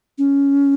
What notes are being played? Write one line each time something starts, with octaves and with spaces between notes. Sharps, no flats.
C#4